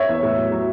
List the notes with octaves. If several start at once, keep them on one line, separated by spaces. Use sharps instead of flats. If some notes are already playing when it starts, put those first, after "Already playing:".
Already playing: C#5 E5
E2
A2
F#3
F#3